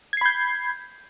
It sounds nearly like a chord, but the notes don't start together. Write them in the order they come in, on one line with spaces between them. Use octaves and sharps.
G#6 C7 B5 G6